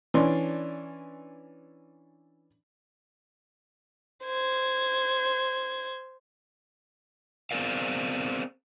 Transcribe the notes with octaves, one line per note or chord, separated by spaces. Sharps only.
E3 C#4 D4 C6
C5 G#6
B3 C4 G#4 A#4 D5 F5